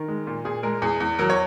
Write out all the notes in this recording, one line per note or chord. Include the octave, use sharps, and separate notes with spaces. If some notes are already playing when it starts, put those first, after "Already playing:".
Already playing: D#3 A#4
G#3
A#2
A#2 G#4
G#3 A#4
E2 G#4
E2
F#3 A#4
C#5